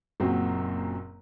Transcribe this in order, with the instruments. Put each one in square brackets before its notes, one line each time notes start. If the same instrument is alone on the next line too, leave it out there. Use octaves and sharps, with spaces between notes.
[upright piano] F#1 F#2 A#2 C4 F#4